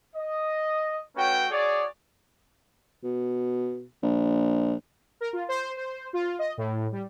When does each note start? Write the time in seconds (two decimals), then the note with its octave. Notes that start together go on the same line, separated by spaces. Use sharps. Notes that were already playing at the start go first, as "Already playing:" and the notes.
0.15 D#5
1.16 A3 C#4 F#4 B4 C#5 G5
1.51 F#4 G#4 C#5 D5
3.04 B2
4.03 A#1
5.21 A#4
5.33 F4
5.49 C5
5.77 C5
6.13 F4
6.39 D#5
6.58 A2
6.92 G3